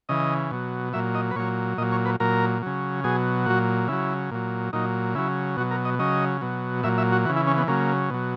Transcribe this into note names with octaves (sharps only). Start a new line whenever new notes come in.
C#3 E3 D#5
B2 F#3
A#2 F#3 E5
D#5
B4
A#2 F#3 C#5
A#2 F#3 D#5
C#5
B4
A#2 F#3 A#4
C#3 F#3
B2 F#3 G#4
A#2 F#3 F#4
C#3 F#3 E4
A#2 F#3
A#2 F#3 D#4
C#3 F#3 E4
B2 F#3 F#4
A#4
D#5
C#3 F#3 D#5
B2 F#3
A#2 F#3 E5
E5
F#4
C#3 E3 F#4
E4
C#4
B3
C#3 F#3 A#3
B2 F#3